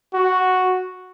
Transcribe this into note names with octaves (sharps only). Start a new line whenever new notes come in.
F#4